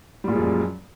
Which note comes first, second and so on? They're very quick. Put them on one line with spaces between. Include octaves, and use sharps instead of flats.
G3 A#2 G#3 F3 F#2